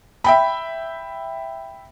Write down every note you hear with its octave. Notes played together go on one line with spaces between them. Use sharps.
E5 G5 B5